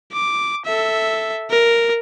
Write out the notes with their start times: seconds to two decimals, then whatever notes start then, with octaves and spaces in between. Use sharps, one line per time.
0.13 D6
0.65 A4 E5
1.51 A#4